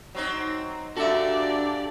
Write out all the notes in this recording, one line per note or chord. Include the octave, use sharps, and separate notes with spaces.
F#3 C4 D#4
A#2 D4 F#4 G4 A4 D5 E5